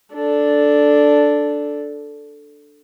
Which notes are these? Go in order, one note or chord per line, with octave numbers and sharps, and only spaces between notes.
D4 A4